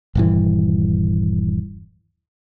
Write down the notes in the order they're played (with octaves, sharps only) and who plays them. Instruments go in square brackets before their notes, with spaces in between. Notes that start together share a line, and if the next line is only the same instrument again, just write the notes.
[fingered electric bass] D#1 G2 E3